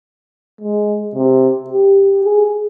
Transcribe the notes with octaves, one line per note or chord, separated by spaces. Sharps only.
G#3
C3
G4
G#4